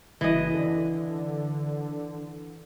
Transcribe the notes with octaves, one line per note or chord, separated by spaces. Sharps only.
F#1 E3 D#5
D3